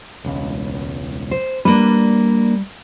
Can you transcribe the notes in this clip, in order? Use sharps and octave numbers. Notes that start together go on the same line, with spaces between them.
E1 C#2
C5
G3 A#3 D4 B4